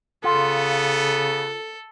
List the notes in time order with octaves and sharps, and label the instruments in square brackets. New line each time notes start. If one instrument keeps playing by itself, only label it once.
[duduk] C#3 [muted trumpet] B3 [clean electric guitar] F4 [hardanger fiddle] A4